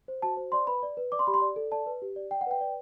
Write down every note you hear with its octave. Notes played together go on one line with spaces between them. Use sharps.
C5
F#4 A5
C5
D5 C6
B4 B5
D5
B4
D5 D6
C6
G4 B5
C6
D5
A4
D5 A5
B4
G4
D5
D5 G5
F#5
B4 G5
D5